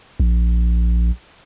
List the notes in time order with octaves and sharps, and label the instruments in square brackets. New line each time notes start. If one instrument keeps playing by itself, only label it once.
[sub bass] A#1